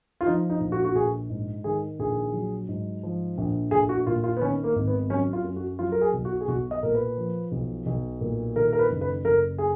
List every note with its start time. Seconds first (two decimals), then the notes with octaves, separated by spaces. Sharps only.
0.21 F4
0.26 F3 D#4
0.50 D#4
0.60 A#1
0.72 F#4
0.85 F#4
0.95 A#1 G#4
1.30 G#2
1.64 D#3 G#4
1.99 A#1 G#4
2.33 F#3
2.68 G#2
3.03 F3
3.38 A#1
3.71 A#1 G#4
3.89 F#4
4.07 A#2 F4
4.24 F4
4.37 B3
4.41 D#3 C#4
4.64 A#3
4.75 G#1
4.87 B3
5.10 F#3 C#4
5.33 F4
5.44 F#2
5.56 F#4
5.79 F#3 F4
5.92 A#4
6.01 G#4
6.14 B1
6.25 F#4
6.41 G#4
6.48 B1 F#4
6.71 D#5
6.83 A#2 A#4
6.95 B4
7.17 F3
7.52 B1
7.86 B1
8.21 A#2
8.56 D#3 A#4
8.73 A#4
8.79 B4
8.90 F#1
9.01 B4
9.24 F#1 A#4
9.58 G#4